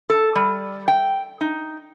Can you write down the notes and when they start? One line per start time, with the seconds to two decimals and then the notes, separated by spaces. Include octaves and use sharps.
0.10 A4
0.35 G3
0.88 G5
1.41 D#4